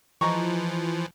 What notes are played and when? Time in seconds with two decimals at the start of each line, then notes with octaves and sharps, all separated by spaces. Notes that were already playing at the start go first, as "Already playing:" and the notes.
0.21 E3 F3 G#3 A#5 C#6